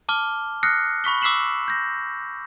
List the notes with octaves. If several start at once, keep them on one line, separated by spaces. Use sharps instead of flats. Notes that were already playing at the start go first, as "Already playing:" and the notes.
A5 D6 F6 G7
D#6 F6 F#6 A#6 C7 C#7
B5 C#6 B6 G7
D6 E6 B6 C7 E7 F#7
G6 A#6